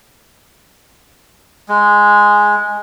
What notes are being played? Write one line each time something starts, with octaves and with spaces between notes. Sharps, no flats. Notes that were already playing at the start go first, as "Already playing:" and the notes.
G#3